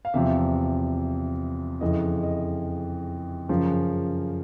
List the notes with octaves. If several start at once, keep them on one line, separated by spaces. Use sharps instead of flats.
F5
E2 C3 F3 E5
F2 C#3 E3 D#5
D#5
F#2 C#3 F3